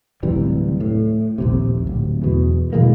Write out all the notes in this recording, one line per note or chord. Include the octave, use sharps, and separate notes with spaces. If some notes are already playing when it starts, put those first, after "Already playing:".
D1 C3 E3 G3
A2
A#1 D#2 C3
D1
E2 B2
B2 E3 G#3 A#3